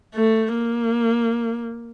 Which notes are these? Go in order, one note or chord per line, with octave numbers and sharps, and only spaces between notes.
A3
A#3